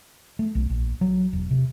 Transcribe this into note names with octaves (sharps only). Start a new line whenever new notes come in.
A3
B1
A#1
F#3
E1
C3